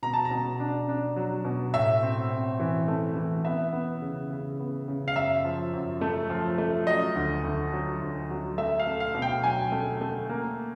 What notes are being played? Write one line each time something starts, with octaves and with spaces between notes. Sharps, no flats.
B2 A#5
A5
A#5
B2
D4
D4
F#3
B2
A2 E5
C4
C4
E3
A3
E3
B3 E5
B3
C#3
C#3
B3
C#3
F5
F#2 E5
F3
F#2
A3
F3
A3
F#3 D#5
D2
D2
F#3
D2
F#3
A3 E5
F5
A3
F5
B2
G5
F#3 G#5
A3
A3
A#3